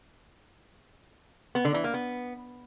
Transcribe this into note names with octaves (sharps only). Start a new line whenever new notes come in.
B3
D3
E3
A#3
B3